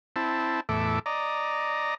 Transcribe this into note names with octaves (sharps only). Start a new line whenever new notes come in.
C4 E4 A5
E2 A2 A4 E5 D6
D5 D#5 A#5